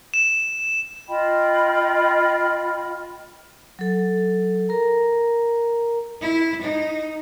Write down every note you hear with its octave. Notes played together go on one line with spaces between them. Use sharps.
E7
F4 D#5 G5 B5
F#3 A4
A#4 A#5
E4
D#4